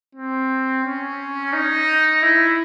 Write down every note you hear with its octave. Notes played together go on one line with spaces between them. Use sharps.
C4
C#4
D#4
E4